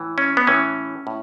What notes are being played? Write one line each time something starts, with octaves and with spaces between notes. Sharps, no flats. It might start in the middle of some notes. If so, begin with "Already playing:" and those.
Already playing: A2 E3
C#4
B3
A2 E3 C#4
A2